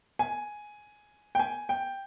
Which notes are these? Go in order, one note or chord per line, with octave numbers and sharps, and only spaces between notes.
G#5
G5
G#5
G5